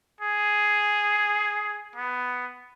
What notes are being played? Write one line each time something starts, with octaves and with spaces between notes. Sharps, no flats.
G#4
B3